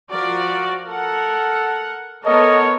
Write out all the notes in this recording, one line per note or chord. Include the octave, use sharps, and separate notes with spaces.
F3 F#4 A#4 D5
A4 A#4 F#5
B3 A4 A#4 C#5 D#5